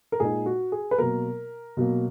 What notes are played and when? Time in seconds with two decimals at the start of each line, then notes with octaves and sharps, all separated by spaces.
0.12 A#4
0.20 A#2 G#3 D#4 G#4
0.46 F#4
0.72 G#4
0.91 B4
0.98 B2 F#3 A#3 A#4
1.77 B2 F#3 A#3